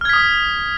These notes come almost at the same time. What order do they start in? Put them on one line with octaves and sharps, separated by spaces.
F6 G#6 B6 D#6